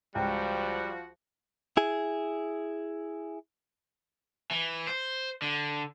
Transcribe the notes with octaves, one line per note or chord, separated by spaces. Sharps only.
C#2 F3 G3 F#4 G5
E4 G#4
E3
C5
D3